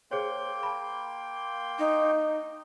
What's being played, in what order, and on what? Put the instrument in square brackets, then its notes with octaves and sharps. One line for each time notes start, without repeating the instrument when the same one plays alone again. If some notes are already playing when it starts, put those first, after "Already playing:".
[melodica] A#3 G5 C6 [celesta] G#4 C5 C#5
[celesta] A5 B5
[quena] D#4